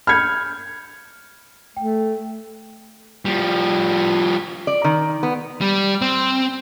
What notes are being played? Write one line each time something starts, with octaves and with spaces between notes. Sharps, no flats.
B5 F6 G6 G#6 C#7
A3 G5
F3 G3
D5
D#3
B3
G3
C4